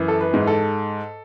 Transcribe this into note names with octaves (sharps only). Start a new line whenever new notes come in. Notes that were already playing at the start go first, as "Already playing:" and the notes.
Already playing: F#2 E3
A4
B4
G#2
A4